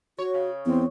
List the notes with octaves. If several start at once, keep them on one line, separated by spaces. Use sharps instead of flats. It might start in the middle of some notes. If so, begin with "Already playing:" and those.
F#4 C#5
C#3
E2 C4